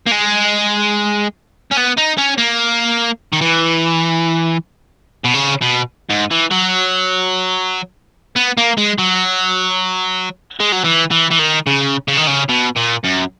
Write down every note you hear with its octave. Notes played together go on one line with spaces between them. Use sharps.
A#3
G#3
C#4
B3
D#4
C#4
A#3
D#3
E3
B2
C#3
B2
G#2
E3
F#3
B3
A#3
G#3
F#3
G#3
F#3
E3
E3
E3
D#3
C#3
C#3
D#3
C#3
B2
A#2
F#2